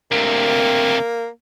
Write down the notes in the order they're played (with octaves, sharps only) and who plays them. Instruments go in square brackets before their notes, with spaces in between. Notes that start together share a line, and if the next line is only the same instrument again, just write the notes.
[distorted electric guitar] D2 C3 [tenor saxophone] A#3